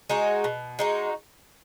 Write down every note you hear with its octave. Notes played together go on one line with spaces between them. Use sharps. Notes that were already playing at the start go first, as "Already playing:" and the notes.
G#3 D#4 F#4
B2
G#3 D#4 F#4